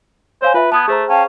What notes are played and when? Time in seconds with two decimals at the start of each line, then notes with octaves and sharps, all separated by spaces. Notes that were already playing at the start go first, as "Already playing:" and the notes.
0.42 C5 C#5 F5 G#5
0.54 F4 B4 E5
0.72 B3 A5 D#6 G#6
0.88 A3 G#4 C5 A#5
1.09 C#4 F5 G5 A5